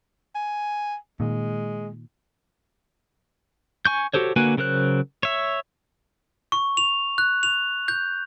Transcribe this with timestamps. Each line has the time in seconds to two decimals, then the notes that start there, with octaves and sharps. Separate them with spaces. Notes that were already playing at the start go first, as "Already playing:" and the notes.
0.35 G#5
1.20 A#2 D#3 G#3
3.85 G#5 C#6 G6
4.13 F#4 G4 A4 C5 C#5
4.36 D3 A#3 F#4 B4 G#5
4.58 C#3 F#3 A#4 C5 F#6
5.23 C#5 E5
6.52 C#6
6.77 F7
7.18 F#6
7.43 F7
7.88 G6